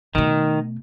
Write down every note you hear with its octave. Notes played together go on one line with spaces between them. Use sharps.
B2 D#3 A3